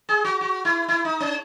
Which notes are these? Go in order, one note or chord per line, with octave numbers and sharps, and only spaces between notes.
G#4
F#4
F#4
E4
E4
D#4
C#4